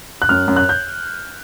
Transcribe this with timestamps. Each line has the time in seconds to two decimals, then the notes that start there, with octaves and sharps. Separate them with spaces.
0.22 F#6
0.29 F#2 F6
0.48 F#2
0.56 F#6
0.69 G6